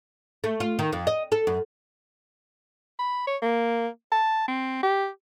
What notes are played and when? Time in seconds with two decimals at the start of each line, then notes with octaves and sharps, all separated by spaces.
0.44 A3
0.60 F4
0.79 D#3
0.93 F2
1.07 D#5
1.32 A4
1.47 F#2
2.99 B5
3.27 C#5
3.42 A#3
4.12 A5
4.48 C4
4.83 G4